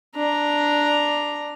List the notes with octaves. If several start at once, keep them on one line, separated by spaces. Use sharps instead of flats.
D4 A#5